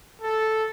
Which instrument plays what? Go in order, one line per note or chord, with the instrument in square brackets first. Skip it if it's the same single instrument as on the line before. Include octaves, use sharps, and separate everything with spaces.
[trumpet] A4